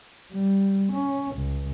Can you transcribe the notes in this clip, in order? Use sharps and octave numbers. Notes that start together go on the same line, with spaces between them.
G3
C#4
C#2